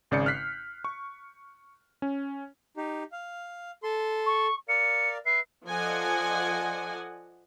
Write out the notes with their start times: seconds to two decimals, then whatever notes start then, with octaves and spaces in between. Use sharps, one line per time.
0.11 G#1 C#3 D5 G6 C#7
0.26 F6 F#6 B6 C7
0.85 C#6
2.02 C#4
2.77 D#4 G4
3.12 F5
3.83 A4 C6
4.26 C#6
4.68 A#4 D5 F5 C#7
5.26 B4 E5 C7
5.66 F3 A4 D5 D#5 F#5 G#5